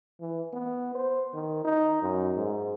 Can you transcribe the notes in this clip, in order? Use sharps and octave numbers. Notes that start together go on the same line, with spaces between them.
E3
B3
C5
D#3
D#4
F#2
G#2